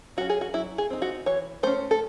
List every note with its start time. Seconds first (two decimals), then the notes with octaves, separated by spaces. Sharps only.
0.17 F#3 C#4 F#4
0.30 G#4
0.41 F#4
0.54 F#3 E4
0.78 G#4
0.90 C4 D#4
1.02 F#4
1.26 E3 C#5
1.63 A3 C#4 C5
1.91 A4